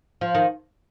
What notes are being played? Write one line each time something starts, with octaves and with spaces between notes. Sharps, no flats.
F3
D#3